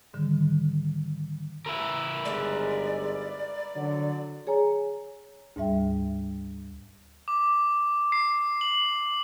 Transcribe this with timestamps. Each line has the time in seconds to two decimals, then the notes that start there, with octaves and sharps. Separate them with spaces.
0.14 G#2 D3 D#3 G3
1.66 A#4 B4 E5
2.25 G1 G#2 G#3 D5
3.75 D3 F#3
4.47 G#4 C#5 G#5 A#5
5.56 D2 G#2 G3 E5 G5
7.28 D6
8.12 C7
8.61 F#7